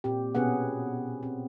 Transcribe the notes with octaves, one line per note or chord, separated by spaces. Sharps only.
A#2 C4 G4
B2 B3 C#4 G#4 F#5
C4